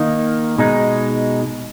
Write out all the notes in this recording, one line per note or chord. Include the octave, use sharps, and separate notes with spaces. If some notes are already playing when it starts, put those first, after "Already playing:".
Already playing: D#3 A#3 D#4
B2 G#3 D#4